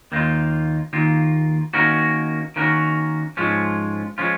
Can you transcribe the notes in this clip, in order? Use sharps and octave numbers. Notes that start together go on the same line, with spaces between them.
D#2 D#3 A#3 F4
D#2 D#3 A#3 F4
D#3 A#3 C#4 F#4 A#4
D#3 A#3 C#4 F#4 A#4
G#2 F3 G#3 C#4 F4
F3 G#3 C#4 F4